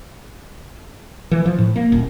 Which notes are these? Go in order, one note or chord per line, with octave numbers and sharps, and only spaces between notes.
E3
F3
A2
A#3
D#1